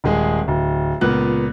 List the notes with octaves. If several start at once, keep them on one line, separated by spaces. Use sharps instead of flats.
D#1 G#3 G#4
D1
C#2 A#2 B3 F#6